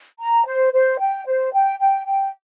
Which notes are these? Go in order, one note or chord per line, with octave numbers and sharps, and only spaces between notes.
A#5
C5
C5
G5
C5
G5
G5
G5